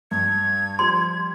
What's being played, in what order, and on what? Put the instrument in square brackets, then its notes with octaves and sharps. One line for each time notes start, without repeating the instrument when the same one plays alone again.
[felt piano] G2 [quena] G#6
[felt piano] F3 G3 [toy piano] C6